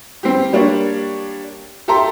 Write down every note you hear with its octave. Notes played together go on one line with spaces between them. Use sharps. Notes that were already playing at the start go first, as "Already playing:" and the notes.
G3 C4 G4
G3 A#3 D4 C#5
G4 A4 E5 A5 A#5 C6